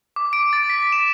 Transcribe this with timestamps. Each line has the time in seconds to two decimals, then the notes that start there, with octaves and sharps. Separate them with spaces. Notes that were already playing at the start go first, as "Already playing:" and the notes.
0.16 D6
0.33 D7
0.53 A6
0.70 B6
0.92 E7